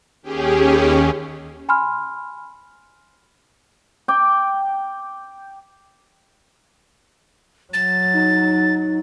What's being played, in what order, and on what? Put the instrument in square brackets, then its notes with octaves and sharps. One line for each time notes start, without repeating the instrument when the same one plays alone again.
[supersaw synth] D#2 C#4 [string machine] G4 G#4
[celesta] G#5 B5 C6 F6
[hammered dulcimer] G5 D6
[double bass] F#3 [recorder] A6
[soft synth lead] D#4